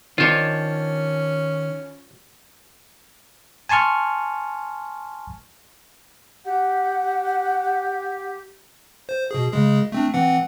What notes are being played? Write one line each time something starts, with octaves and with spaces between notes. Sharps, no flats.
D#3 C#4 D4 F4 C5 C#5
G#5 A5 C6 C#6 F6
G4 F#5
C5
B2 G#4
C#3 G#3 G#4
A3 C4 D4
E3 C4 F#5